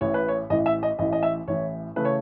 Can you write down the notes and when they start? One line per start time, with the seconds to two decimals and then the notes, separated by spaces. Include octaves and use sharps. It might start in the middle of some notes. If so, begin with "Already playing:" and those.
0.01 A1 A2 E3 C#5
0.14 B4
0.28 C#5
0.50 A1 A2 E3 D#5
0.66 E5
0.83 D#5
0.99 A1 A2 E3 D#5
1.13 D#5
1.23 E5
1.47 A1 A2 E3 C#5
1.96 C#3 E3 A3 B4
2.05 C#5